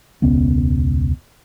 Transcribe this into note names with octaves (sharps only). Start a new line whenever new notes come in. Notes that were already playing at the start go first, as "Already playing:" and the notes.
E1 C#2 B3 C#4